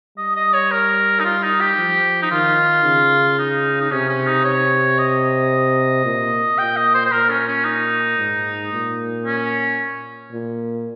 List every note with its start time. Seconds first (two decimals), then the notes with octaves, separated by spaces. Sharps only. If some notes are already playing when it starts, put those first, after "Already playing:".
0.18 G3 D#5
0.35 D#5
0.53 C#5
0.71 A#4
1.20 D#4
1.24 F4
1.43 D#4
1.60 G4
1.78 F3
2.22 D#4
2.31 D#3 F4
2.84 C#3
3.39 D#4
3.80 D#4
3.92 C3 C#4
4.09 C#4
4.27 D#4
4.45 C#5
4.98 D#5
6.05 A#2
6.58 A#2 G5
6.76 D#5
6.95 C5
7.05 C5
7.12 A#2 A#4
7.30 C#4
7.48 C#4
7.65 D#4
8.18 G#2
8.72 A#2
9.26 C#4
10.32 A#2